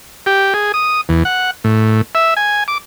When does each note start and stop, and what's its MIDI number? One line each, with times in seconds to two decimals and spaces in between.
0.26 0.53 67
0.54 0.72 68
0.74 1.01 87
1.09 1.23 40
1.25 1.51 78
1.64 2.02 45
2.15 2.34 76
2.37 2.64 80
2.68 2.78 86